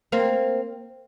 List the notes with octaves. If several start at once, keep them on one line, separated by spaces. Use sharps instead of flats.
A#3 C4